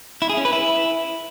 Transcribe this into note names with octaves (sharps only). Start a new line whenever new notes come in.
E4
G#4
C#4
B4
E4